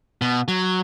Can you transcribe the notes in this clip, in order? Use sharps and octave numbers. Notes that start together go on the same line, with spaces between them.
B2
F#3